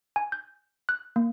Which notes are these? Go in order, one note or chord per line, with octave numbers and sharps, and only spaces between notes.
G#5
G6
F#6
A#3